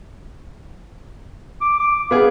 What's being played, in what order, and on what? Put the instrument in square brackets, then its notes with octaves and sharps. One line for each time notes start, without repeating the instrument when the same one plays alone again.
[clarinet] D6
D6
[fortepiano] B3 G#4 [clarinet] F5